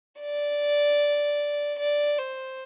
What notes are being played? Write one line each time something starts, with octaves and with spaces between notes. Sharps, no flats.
D5
D5
C5